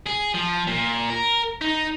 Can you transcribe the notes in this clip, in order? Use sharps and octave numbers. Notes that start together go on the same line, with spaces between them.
G#4
F3
A#2
A#4
D#4